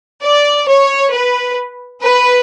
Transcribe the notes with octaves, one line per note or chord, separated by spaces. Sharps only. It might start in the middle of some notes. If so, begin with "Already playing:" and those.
D5
C#5
B4
B4